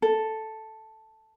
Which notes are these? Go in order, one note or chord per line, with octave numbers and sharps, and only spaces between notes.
A4